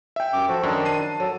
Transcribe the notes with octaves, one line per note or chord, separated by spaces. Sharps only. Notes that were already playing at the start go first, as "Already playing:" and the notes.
E5 G5
F#2 D6
F3 F#4 A4
F#2 D#3 D4
A5 C7 D#7
F#3 A4